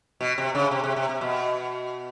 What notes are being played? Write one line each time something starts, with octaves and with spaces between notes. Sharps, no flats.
B2
C3
C#3
C3
C3
C3
C3
B2